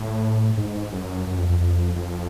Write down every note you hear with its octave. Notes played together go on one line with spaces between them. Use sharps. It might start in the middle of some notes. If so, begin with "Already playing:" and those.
Already playing: A2
G#2
F#2
F#2
F2
F2
F2
F2